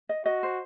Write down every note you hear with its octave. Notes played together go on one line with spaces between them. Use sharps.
D#5
F#4 D#5
C5